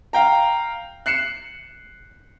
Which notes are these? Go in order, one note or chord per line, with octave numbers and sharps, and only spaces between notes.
F5 G5 A#5
F#6 C7 C#7 E7